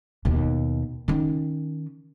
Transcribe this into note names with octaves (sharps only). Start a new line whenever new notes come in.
D#2 B2
D#3 C#4